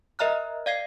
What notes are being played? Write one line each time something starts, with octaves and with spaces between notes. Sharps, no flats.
A#4 D#5 E5 A#5 F6 F#6
D5 F5 G#6 C7